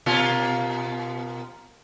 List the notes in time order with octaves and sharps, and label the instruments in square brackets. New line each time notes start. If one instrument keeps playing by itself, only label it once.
[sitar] B2 A#3 F4